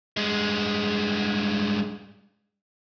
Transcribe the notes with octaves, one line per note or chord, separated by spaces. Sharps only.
G2 G#3